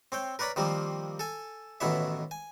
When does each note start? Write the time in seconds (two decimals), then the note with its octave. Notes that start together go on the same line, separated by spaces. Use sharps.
0.12 C4 C#5 G5
0.39 A#4 B4 C#5 D5 A#5 B5
0.56 D#3 F3 G3 A#3 C4
1.19 A4 G#5
1.80 A1 B2 D#3 E4 C#5 E5
2.31 G#5